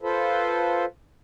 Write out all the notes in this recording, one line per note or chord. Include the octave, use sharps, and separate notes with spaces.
F4 A4 B4 C5